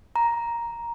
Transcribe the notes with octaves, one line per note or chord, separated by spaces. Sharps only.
A#5